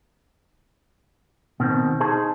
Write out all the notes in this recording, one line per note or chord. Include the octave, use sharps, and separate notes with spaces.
B2 D#3 C4
D#4 G#4 C5 A5